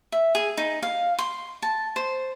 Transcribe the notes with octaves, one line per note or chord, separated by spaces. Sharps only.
E5
G#4
D#4
F5
C6
A5
C5